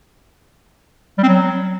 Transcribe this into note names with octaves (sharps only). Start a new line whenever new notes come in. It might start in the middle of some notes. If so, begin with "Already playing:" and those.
G3
C4
F#3